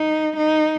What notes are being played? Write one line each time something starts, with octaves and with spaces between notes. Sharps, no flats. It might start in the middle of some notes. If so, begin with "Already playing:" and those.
Already playing: D#4
D#4